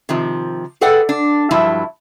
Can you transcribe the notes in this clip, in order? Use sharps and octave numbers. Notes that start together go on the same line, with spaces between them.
C3 D#3 F3
G#4 A4 B4 D5 F#5 G5
D4
G2 F3 F#3 E4 E5